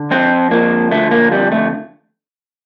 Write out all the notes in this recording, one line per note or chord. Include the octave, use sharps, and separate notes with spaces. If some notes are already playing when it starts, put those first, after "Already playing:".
Already playing: D3
F2 C4
F3 A#3
D3 A3
A#3
F2 G3
A3